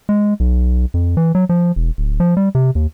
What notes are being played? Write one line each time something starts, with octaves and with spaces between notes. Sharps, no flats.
G#3
B1
F2
E3
F#3
F3
E1
D1
F3
G3
C3
D#2